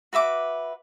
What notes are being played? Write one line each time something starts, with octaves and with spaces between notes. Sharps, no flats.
F#4 B4 E5 D6